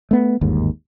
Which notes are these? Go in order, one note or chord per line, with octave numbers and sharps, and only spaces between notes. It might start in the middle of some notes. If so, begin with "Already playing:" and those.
A3 B3
G1 D#2 G#2